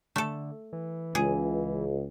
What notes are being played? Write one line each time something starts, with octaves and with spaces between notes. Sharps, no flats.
D3 A3 A4
E3
C#2 G#4